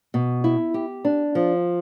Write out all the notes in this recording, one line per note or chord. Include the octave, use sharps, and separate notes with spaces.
B2
E4
G4
D4
F3